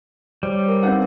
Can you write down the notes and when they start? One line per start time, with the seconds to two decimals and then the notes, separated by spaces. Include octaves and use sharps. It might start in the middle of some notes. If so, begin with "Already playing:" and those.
0.43 G3 C5 C#5
0.68 A#4 B4
0.83 C4 D4 D#4 B4 F5 F#5